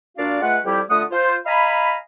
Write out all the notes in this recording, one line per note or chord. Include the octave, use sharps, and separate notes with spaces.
A#2 D4 F#4 D5 F5
G#3 A3 F4 B4 F#5
F2 G3 E4 G4
D3 A3 F4 F#5 D#6
F4 C5
D#5 F5 G#5 A#5 B5